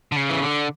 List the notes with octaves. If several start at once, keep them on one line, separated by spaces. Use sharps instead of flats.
D3
C#3
E3
D3